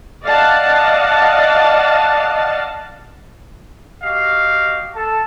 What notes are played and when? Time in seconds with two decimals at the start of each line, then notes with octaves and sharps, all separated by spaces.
0.23 D5 D#5 F5 F#5 A5
4.03 F#4 G4 D#5 F5
4.95 A4 A5